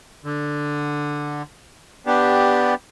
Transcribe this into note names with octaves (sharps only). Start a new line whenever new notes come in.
D3
B3 D4 G4